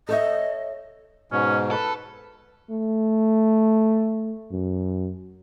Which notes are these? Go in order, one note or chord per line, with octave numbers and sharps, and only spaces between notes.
A4 C#5 D#5 E5
G#2 B2 C#4
A4 B4
A3
F#2